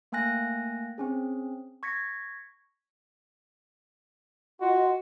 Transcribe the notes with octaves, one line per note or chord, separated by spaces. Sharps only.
A3 A#3 G5 G#5 F#6 A#6
C4 C#4 G#4
C#6 G#6 A#6 B6 C#7
F4 F#4 D#5 C6